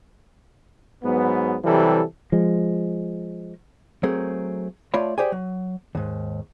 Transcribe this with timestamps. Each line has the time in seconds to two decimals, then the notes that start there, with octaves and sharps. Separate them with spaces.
1.03 G#2 F#3 B3
1.64 C3 E3 F#3 G3 A4
2.32 F3 G#3
4.03 F#3 A3 C4 G#4 A#4
4.94 A3 F4 C#5 D5 A5 B5
5.18 G4 G#4 C5 D5 G5 G#5
5.32 F#3
5.95 D#2 G#2